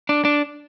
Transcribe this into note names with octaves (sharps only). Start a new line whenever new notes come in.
D4
D4